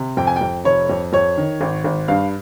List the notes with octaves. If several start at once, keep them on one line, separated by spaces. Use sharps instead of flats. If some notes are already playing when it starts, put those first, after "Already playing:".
Already playing: C3
F2 G5
G#5
G5
F2
F1 C#5
F2
F2 C#5
D#3
G#1
G#1
G2 F5